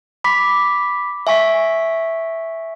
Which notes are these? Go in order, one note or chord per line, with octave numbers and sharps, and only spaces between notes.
B5 D6 B6
E5 G#5 C#6 B6